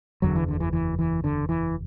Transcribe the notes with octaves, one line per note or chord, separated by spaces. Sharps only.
F#1 E2 D3 F#3
E3
D3
E3
E3
E3
D3
E3